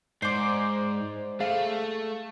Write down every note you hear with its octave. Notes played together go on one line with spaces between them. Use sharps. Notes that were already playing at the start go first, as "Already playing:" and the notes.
G#2 C5 D5
A3 G#4 F5